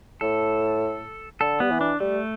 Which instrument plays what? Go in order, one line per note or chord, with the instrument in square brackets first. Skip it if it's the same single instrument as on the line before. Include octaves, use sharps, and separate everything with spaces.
[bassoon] A2 [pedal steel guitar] A4
[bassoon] D3 [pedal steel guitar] A4
[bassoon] G3 [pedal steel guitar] B3
[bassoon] E3
[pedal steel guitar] D4
[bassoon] G3 [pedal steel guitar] A3